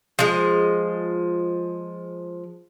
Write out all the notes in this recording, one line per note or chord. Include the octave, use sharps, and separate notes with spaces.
F3 G#3